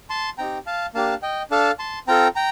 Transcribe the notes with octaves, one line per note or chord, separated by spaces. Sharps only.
A5 C6
C4 D#4 G4 G5 A#5
F5 A5
A#3 D4 G4 F5 A5
D#5 G5
D4 A4 F5 A5
A5 C6
C4 F4 A4 G5 A#5
G5 A#5